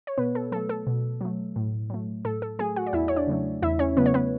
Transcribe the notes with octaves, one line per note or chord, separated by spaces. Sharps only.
C#5
B2 B3 B4
A4
F#3 A3 A4
A4
B2
F#3 A3
A2
F#3 A3
A2 A4
A4
F#3 A3 G#4 G#5
F#4 F#5
D5
E2 E4 E5
C#5
D4 D5
C#3 F#3 A3
E2 E4 E5
C#4 C#5
C#3 F#3 A3 B3 B4
C#5
B3 B4